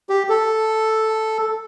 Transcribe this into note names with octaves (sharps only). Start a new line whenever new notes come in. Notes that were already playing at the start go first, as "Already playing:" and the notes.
G4
A4